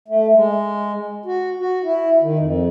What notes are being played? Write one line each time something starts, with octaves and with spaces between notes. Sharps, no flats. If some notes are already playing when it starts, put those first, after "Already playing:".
A3
G#3
F#4
F#4
E4
D#3
F2